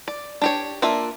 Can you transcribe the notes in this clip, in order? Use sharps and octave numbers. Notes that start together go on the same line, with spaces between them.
D5
D4 G4 C#5
A#3 D4 F4 E5